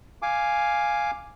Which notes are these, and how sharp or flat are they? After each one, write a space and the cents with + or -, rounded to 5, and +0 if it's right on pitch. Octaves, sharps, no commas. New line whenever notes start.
F5 +0 G#5 +0 D6 +0